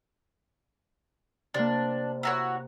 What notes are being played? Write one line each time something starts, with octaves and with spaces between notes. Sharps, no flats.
C3 A#3 D4
E4 F#4 C#5 A#5